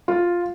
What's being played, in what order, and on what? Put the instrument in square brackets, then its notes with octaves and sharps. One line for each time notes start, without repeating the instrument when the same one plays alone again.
[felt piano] F4